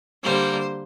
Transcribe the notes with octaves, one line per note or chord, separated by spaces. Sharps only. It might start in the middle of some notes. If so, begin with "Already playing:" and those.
D3 G3 A#3 C5